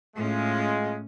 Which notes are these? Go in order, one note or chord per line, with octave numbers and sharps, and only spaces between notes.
A2 G#3 C#4 F4